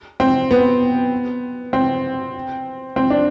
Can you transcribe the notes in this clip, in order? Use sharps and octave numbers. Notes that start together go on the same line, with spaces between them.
C4
B3
C4
C4
D4